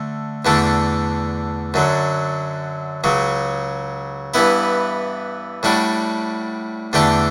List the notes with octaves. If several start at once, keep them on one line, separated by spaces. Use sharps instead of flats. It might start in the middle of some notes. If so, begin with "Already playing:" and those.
Already playing: D3 A3
E2 D3 A3 D4
F#2 D3 F#3
C#2 C#3 F#3
G2 E3 B3 E4
A2 G3 D4 F#4
E2 D3 A3 D4 G4